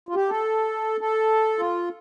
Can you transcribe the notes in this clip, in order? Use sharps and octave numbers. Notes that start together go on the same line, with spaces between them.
F4
G4
A4
A4
F4